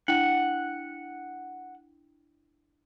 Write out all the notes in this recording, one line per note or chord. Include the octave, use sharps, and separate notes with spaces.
D4 E4 F#5 G5